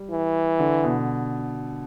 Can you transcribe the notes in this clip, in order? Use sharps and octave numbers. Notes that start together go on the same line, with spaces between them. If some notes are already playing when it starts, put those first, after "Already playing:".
Already playing: G3
E3
D3
B2